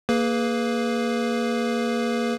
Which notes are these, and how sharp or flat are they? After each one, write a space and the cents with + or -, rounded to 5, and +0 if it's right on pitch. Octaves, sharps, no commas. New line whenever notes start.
A#3 -5 G#4 +20 B4 +0